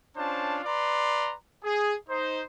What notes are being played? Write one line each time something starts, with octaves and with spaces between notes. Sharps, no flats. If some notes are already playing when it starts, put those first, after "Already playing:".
C#4 D4 F4 C5 A5
B4 D5 A#5 C6
G#4
D#4 C5